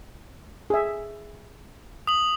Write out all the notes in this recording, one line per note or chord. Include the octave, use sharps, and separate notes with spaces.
G#4 E5
D#6 F#7